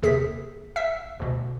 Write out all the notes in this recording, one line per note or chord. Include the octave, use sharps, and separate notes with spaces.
D#2 C3 G#4 B6
E5 E6 B6
D2 B2